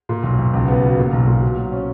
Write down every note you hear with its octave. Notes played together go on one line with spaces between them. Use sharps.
A#2
B1
B1
C#2
B3
B2
A#2
B1
A#2
B2
F#3
C#4